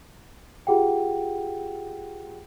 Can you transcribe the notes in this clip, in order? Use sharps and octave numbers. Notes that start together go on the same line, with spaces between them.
F4 G4 G#4 F#5 G5